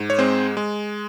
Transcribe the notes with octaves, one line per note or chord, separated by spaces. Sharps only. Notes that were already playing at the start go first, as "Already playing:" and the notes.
Already playing: G#2
C#5
G#3 C4 C5
G#3